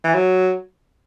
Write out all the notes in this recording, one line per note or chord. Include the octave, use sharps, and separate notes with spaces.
E3
F#3